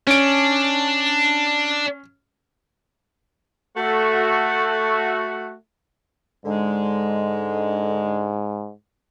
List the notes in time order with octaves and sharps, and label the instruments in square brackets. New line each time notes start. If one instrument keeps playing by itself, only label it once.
[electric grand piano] C#4 D7 [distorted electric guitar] D4
[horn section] A3 F#4
[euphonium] G#2 [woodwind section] D3 G#3